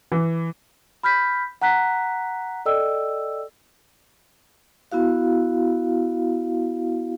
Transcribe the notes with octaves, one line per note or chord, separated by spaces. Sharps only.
E3
B5 F6 G6 B6
F#5 A#5 F#6 B6
A4 D5 D#5 G5 E6
B3 E4 F#4 F5